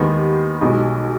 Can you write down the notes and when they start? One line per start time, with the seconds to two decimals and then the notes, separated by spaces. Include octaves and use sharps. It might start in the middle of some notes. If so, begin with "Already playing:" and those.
Already playing: D#2 D#3 G#3 B3 D#4
0.61 B1 B2 G#3 D#4